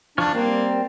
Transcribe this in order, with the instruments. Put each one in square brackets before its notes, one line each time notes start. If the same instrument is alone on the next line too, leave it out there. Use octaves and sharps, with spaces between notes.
[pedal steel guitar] F3 C#6 F6 [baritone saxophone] D4
[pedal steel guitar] G3 C4 [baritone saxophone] A#3